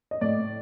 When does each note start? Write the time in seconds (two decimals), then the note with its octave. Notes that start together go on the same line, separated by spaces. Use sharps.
0.11 D#5
0.21 A2 D5